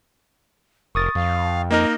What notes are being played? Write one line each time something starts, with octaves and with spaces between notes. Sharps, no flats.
F1 A#4 C#6 D#6 A6
F2 F5
A#3 D#4 A#4 D#5